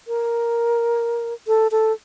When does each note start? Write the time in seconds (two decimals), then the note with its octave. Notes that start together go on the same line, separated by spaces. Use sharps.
0.08 A#4
1.48 A4
1.71 A4